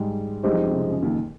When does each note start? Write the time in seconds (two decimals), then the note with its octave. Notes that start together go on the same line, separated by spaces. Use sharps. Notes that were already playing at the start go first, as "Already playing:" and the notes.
Already playing: G#2 G3 G#3
0.43 G2 G3 G#3 D#4 G4 C5 D#5
0.52 F2 F3
0.61 C#3
0.70 C3
0.79 C#3
0.91 C#3
1.03 D#2 D#3